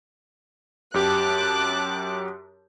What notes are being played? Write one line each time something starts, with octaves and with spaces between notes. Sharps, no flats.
F#2 G4 A5 D6 F#6